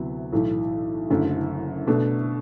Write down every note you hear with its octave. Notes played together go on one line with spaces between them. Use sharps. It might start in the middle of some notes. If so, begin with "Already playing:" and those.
Already playing: D2 C3 F#3 B3 E4
B1 A2 E3 A3 E4
F#1 F#2 D3 A3 E4
B2 A3 D4